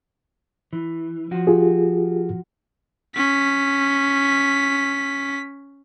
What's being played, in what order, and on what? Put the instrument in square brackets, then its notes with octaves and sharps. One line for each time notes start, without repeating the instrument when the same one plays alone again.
[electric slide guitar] E3
F3 F#4
[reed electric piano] F4 G4 G#4
[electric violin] C#4 B6